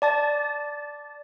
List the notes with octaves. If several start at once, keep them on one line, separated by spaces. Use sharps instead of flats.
D5 A5 A6